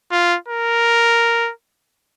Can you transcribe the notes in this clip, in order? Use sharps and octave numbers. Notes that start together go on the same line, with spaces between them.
F4
A#4